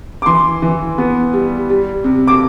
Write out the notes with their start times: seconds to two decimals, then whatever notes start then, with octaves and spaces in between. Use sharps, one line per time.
0.22 D6
0.26 E3 C6
0.62 E3
0.98 B3
1.33 G3
1.70 G3
2.04 C3
2.27 D6